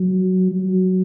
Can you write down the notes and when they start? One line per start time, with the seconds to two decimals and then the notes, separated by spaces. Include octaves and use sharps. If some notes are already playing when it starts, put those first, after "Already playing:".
Already playing: F#3
0.52 F#3